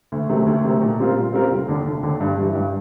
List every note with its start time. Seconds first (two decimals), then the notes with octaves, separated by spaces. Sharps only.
0.12 D2
0.29 C3 D#3 F#3 A3
0.46 D2
0.64 C3 D#3 F#3 A3
0.82 A#2
0.99 G3 C4 F4 A#4
1.15 A#2
1.33 G3 C4 F4 A#4
1.51 F1
1.68 D#2 D3
1.85 F1
2.03 D#2 D3
2.20 G2
2.37 E3 G3
2.55 G2